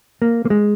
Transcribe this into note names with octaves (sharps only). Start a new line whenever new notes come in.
A#3
A#3
G#3